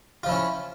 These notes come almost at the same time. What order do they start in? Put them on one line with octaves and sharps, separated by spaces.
F4 F3 E4 C#4